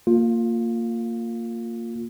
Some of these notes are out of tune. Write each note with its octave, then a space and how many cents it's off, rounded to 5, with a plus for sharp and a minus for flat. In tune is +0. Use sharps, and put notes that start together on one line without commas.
A#3 -20 F4 +15